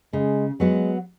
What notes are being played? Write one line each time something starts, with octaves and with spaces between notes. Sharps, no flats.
C#3 G#3
F#3 G#3 B3 F#4